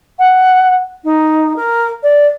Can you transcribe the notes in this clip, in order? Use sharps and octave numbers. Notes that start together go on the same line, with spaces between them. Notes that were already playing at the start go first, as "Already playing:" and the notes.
F#5
D#4
A#4
D5